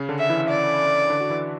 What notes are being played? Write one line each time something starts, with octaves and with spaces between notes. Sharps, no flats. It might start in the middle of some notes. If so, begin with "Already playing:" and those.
Already playing: C#3 C#4
D3 D4
E5
E3 E4
D5
D3 D4
F#4
E3 E4